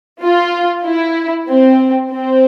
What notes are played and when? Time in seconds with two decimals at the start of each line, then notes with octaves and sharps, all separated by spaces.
0.22 F4
0.85 E4
1.48 C4
2.11 C4